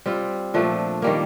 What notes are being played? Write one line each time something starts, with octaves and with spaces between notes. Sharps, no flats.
G3 C4 F4
A#2 F3 A3 D4
D#3 G3 A#3